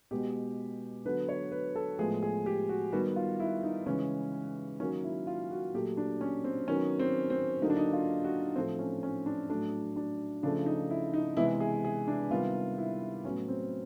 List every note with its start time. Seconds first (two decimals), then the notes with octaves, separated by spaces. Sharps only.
0.11 B2 G#3 B3 G4
1.05 D3 F#3 B3 B4
1.29 C#5
1.52 B4
1.75 A4
1.99 A2 F3 G#3 B3 G#4
2.23 G#4
2.46 G4
2.69 F#4
2.92 D#3 G3 B3 F#4
3.16 F4
3.40 E4
3.63 D#4
3.86 C#3 E3 G#3 C#4
4.80 D#3 F#3 A#3 C#4
5.04 E4
5.27 F4
5.51 F#4
5.74 A#2 F#3 A3 G4
5.97 D4
6.21 C#4
6.44 C4
6.68 D#3 F#3 B3 C#4
7.00 C4
7.30 C4
7.62 D3 F#3 A#3 D#4
7.70 D4
7.77 D#4
7.93 F4
8.24 F#4
8.56 A2 F3 A3 C4
8.79 C#4
9.03 C#4
9.26 D4
9.49 A2 F#3 A3 D4
9.96 D4
10.43 C#3 F3 A3 D4
10.66 D#4
10.90 E4
11.14 D#4
11.37 C3 E3 G#3 B3 E4
11.60 G#4
11.85 G#4
12.08 D4
12.30 C3 D#3 G3 B3 F4
12.78 E4
13.25 A2 F#3 B3 C#4
13.48 C4